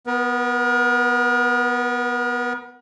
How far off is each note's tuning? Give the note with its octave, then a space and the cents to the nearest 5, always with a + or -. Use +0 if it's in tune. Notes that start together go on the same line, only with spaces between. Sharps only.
B3 +0 A#4 +45